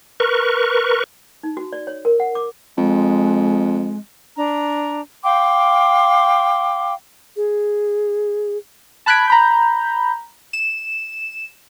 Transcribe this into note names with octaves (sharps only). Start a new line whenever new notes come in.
A#4 B4 C#6
D#4
F#4
D5
C#5
A#4
F#5
D6
F2 G#3
D4 A#5
F5 G5 C6 D6
G#4
A5 B5 F#6 G#6 B6 D7
A#5 B5 G6
E7